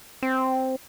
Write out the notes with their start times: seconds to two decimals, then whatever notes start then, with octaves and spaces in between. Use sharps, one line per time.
0.22 C4